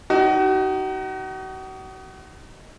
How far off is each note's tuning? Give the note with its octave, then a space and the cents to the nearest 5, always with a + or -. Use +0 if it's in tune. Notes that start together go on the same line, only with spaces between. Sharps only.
D#4 +0 F#4 +40